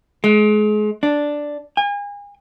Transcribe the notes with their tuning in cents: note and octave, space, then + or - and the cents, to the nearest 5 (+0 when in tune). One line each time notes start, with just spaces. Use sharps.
G#3 +30
D4 +0
G#5 -35